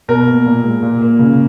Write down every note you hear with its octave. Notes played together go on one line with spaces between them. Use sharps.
B2 A#4
A#3
A#2
G#3
A#2
A#3
C#3